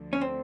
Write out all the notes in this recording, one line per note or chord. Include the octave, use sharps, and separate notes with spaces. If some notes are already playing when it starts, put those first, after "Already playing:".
Already playing: D2 D3 F3 A3
C#4
C4